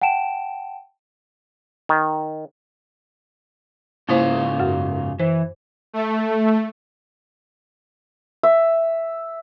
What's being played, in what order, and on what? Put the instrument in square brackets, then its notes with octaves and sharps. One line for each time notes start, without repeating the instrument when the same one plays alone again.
[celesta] F#5 G5 A5 D7 E7
[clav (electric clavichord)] D#3
[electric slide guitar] G#2 C#3 F4 [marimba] A#3 E4 C5
[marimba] F#2 F#4
[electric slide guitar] E3 [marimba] C5
[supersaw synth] A3
[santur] E5